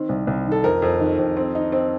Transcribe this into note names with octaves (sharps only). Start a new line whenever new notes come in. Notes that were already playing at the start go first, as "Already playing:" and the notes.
Already playing: D#3 C4
C2
C2
D#3
A4
F2 A#4
F2
D#3
F2
C4
D#4
C4